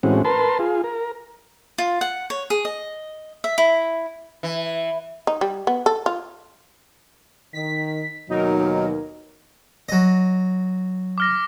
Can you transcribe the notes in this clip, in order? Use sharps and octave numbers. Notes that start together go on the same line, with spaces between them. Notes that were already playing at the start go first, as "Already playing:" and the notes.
A2 E3 G#3 C4 C#4 F#4
A#4 B4 A5 C6
F4 G#4
A#4
F4
F#5
C#5
G#4
D#5
E5
E4
E3
D#4
G3
B3
A4
F4
D#3 B6
D#2 B2 F#3 D#4 A#4
F#3 D#5
D6 F6 A#6